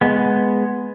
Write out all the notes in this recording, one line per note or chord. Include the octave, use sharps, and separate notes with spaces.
G#3 B3